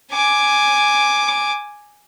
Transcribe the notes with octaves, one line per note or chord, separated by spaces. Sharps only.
G#5 D6